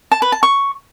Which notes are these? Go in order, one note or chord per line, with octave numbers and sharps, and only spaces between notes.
A5
B4
A5
C#6